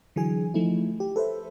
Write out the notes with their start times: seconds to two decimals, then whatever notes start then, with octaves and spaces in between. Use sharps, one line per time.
0.16 D3 E3 F#3 G#4 G#5
0.54 F3 A3 D#4 E4
1.00 G4
1.16 A4 B4 C5 E5